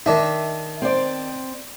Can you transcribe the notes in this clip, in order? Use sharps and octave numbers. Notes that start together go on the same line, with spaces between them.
D#3 D4 D#4 E5
C4 C5 D5